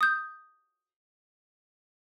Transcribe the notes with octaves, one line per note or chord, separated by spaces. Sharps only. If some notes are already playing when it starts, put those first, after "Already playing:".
D#6 G6